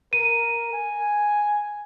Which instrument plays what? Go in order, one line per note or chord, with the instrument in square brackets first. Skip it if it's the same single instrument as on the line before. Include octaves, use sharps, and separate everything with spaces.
[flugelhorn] A#4 [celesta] D#7
[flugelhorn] G#5